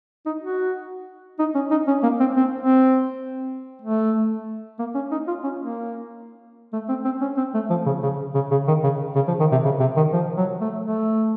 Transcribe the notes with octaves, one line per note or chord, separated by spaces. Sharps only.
D#4
F#4
D#4
C#4
D#4
C#4
A#3
C4
C4
C4
A3
A#3
C#4
D#4
F4
C#4
A#3
A3
C4
C4
C#4
C4
A3
F3
C#3
C#3
C#3
C#3
D#3
C#3
C#3
F3
D#3
C3
C#3
C3
D#3
F3
F#3
A3
A3